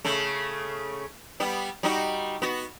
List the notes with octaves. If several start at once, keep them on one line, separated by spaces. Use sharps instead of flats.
C#3 A3
G3 B3
G3 D#4 F#4
B3 F#4